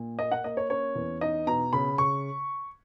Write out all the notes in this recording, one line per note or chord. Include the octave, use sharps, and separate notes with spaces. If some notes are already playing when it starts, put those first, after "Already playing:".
Already playing: A#2
A#3 D#5
F#5
A#3 D#5
C#5
C#4 C#5
E2
D#4 D#5
B2 A#5
C#3 B5
C#3 C#6